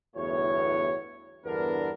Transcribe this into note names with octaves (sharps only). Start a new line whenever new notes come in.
G1 E2 A2 F#4 C#5
E2 G2 D3 B3 D4 A#4